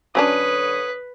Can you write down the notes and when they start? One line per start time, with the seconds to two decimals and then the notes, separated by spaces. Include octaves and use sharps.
0.15 D3 F#3 C#4 D4 B4 C#5 D#6